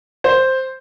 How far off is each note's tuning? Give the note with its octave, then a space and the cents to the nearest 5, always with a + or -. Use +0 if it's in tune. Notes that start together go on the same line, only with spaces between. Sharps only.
C5 +0